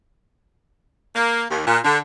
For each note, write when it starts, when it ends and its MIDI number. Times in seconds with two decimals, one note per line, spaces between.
1.15 1.44 58
1.51 1.62 39
1.66 1.79 46
1.85 1.99 50